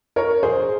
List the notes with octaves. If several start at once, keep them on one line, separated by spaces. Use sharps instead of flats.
A#4 C#5
G#4 C5